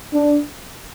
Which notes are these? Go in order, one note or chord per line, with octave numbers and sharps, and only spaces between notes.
D4